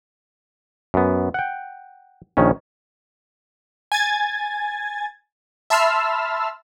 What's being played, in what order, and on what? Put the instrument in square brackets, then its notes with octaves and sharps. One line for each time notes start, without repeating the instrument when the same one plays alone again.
[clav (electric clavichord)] F#2 B3
F#5 G5
A#1 D#3 C#4
[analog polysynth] G#5 G#6 A6
E5 A5 B5 C6 E6 F6